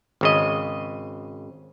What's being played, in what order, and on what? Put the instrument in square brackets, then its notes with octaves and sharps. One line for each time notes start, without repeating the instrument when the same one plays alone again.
[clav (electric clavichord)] G#1 C#3 D#5